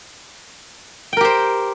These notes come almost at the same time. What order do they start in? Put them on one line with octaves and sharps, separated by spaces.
G5 A#4 G4 C5